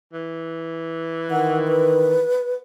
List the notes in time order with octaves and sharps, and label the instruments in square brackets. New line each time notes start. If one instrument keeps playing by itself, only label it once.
[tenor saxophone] E3
[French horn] D#3 [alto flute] F#5
[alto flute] B4